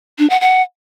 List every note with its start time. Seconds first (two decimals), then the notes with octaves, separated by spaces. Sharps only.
0.19 D4
0.30 F#5
0.41 F#5